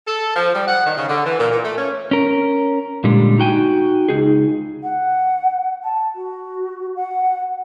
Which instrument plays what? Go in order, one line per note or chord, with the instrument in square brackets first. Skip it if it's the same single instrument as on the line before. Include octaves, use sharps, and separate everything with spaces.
[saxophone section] A4
F3
G3
F#5
D#3
C#3
D3
E3
A#2
A#2
A3
C#4
[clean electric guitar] C#4 A#4
A#2 D3 G3 G#3
D#4 F#4 G5 G#5
C#2 D#4 G#4
[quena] F#5
A5
F#4
F#5